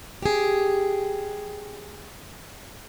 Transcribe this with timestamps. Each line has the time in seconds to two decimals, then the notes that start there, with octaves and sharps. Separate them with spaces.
0.22 G4 G#4